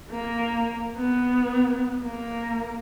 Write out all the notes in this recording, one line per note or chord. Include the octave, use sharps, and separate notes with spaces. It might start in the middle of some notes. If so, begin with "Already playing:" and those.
A#3
B3
A#3